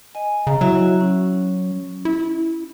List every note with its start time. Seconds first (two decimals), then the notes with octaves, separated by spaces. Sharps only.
0.15 D#5 G#5
0.47 C#3 A#5
0.61 F#3 E4 F#4 E5
1.01 C#4
2.05 E4